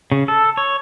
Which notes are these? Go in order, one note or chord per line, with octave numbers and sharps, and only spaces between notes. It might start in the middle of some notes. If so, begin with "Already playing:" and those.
C#3
A4
C#5